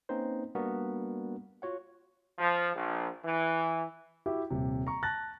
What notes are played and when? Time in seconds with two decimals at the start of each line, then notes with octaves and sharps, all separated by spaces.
0.09 A#3 C4 C#4 D#4 B4 C5
0.55 G3 A#3 B3 D4 F#4 A#4
1.62 F4 F#4 C#5 F#5
2.39 F3
2.74 A#1
3.23 E3
4.26 E4 F#4 G4 E5
4.50 D#1 C3
4.87 A#5 C#6
5.03 A5 F#6 A6 A#6